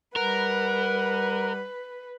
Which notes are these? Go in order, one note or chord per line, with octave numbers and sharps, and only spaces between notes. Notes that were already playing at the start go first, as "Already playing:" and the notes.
G3 A#4 B4 F#5